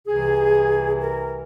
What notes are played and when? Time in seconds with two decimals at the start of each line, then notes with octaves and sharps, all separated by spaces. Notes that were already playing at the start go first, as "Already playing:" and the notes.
0.07 C2 C3 E3 G#4
1.02 A#4